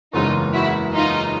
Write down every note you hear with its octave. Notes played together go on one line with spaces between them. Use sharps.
F#1 E2 C#3 E3 G#3 D#4 F4
E4 F#4
D#4 F4